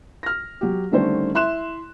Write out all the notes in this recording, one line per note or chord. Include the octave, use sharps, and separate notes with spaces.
F6 A#6
F#3 G4
D3 D#3 G3 A3 C#4 C5
E4 E5 C6 F#6 E7